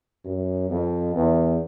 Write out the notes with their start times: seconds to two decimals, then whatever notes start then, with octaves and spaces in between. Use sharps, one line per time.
0.25 F#2
0.70 F2
1.15 E2